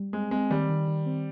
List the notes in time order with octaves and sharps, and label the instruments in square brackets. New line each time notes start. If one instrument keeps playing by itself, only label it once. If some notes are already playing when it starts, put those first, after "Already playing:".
Already playing: [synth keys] G3
[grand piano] G#3 [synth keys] C4
[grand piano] G#3 [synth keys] C4
[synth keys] D#3 [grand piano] G3
[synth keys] D#3
D#3
C4